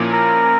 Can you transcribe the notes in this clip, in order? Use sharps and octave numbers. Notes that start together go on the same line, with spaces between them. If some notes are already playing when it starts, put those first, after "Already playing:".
Already playing: A#2 F3 A#3 C#4 E4
A#4